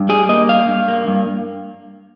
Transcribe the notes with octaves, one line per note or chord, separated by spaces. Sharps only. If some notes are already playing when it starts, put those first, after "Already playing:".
Already playing: G2
G3 G#4
A#3 D#5
G2 F5
G2
A#3
G2